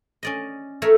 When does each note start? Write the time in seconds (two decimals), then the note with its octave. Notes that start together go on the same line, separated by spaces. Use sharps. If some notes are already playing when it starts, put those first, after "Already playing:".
0.23 C#4 D5 D#5
0.82 A3 A#4 C#5 E5